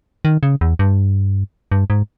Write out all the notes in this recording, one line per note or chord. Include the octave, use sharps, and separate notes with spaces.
D#3
C#3
E2
G2
G2
G#2